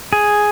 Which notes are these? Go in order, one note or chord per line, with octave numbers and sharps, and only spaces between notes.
G#4